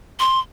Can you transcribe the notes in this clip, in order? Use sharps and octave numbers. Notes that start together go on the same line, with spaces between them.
C6